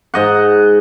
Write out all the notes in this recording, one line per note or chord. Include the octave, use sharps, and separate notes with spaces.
G#2 D#5 F#5